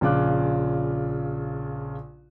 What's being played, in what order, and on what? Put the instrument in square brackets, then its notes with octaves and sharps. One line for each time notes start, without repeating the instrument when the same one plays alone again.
[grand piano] A#1 C#3 F4 D6 F#6